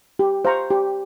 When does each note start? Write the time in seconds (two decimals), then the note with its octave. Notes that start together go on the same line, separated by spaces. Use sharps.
0.19 G4
0.45 C5 F5 A#5 C#6
0.70 G4